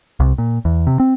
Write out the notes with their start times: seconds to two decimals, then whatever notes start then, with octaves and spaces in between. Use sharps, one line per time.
0.20 C2
0.38 A#2
0.65 E2
0.87 C3
1.00 C4